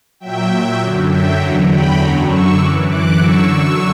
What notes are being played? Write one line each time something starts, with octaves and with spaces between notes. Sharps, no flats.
A#2 F#3 E5 G5
F#2 D3 F#3
E5 G5
E2 D3 F#3 F#5 A#5
G5 B5
F#2 D3 F#3 A#5 C#6
C#6 E6
F#2 E3 D6 F#6
D6 F#6
F#2 D3 F#3 C#6 E6